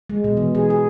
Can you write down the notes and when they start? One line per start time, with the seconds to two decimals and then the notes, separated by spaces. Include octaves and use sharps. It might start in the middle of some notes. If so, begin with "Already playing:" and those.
0.10 G#3
0.24 B2
0.37 E3
0.55 G#4
0.70 G#4